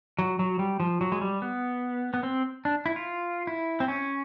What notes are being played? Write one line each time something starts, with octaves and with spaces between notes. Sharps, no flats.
F#3
F#3
G3
F3
F#3
G#3
G3
B3
B3
C4
D4
E4
F4
E4
C4
C#4